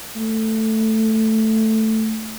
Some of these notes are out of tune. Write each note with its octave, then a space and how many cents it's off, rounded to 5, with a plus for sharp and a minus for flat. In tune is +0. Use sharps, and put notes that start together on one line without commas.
A3 +5